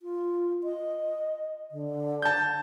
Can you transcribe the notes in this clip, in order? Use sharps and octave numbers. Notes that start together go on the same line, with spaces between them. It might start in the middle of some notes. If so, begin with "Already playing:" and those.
F4
D#5
D3
A5 G6